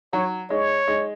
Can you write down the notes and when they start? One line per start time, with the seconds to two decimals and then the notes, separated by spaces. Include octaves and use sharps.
0.13 F#3 C#5
0.50 G#3 C#5
0.88 G#3